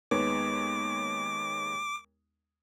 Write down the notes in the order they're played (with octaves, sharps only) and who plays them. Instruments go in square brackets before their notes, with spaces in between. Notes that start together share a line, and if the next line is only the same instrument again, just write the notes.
[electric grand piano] D#2 G#3 C#5 [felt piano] B3 D#4 [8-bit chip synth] D6